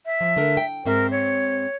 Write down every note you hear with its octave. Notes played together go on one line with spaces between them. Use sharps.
E5
F3
D3 A3 A#4
G5
G#2 C4 A#4 E5
C#5